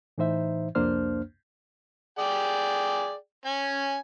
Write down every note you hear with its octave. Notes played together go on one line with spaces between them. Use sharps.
A2 E3 D#4 C5 E5
C2 F2 A#3 D4 C5 F6
G#4 D5 G5
C#4 G#5